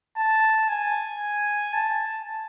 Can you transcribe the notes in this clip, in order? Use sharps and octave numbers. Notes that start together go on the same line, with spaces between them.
A5
G#5
A5